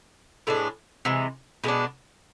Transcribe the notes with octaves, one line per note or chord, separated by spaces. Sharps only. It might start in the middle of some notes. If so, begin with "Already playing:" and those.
A2 G#3 B3 D4
C3 E3 G#3
B2 G#3 B3 D4